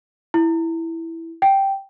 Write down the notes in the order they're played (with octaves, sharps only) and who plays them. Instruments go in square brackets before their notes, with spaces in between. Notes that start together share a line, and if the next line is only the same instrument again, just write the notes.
[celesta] E4
G5